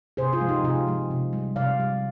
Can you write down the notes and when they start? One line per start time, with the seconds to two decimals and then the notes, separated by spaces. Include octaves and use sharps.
0.17 C3 G#4 C5
0.33 F4 G#4
0.41 F3 G#3
0.48 D#4 G4
0.63 C3 F4 G#4
0.87 F3 G#3
1.11 C3
1.33 G3
1.56 C3 D5 F5
1.80 G3